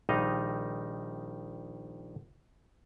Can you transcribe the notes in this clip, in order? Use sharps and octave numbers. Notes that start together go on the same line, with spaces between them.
A#1 D#3 G3 D#4 D#5 F5